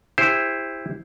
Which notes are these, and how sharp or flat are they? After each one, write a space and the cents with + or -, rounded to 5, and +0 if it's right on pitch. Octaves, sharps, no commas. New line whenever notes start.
E4 +0 G4 +35 C5 +0